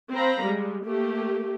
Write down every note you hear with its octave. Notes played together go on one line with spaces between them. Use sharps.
C4 C5 F5 A#5 B5
G3 G#3
A3 A#3 G4